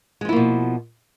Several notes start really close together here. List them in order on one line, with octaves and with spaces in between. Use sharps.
G#3 F3 E4 A#3 B2